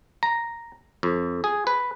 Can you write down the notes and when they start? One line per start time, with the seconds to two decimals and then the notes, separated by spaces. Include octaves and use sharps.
0.23 A#5
1.03 F2
1.44 G#4
1.67 B4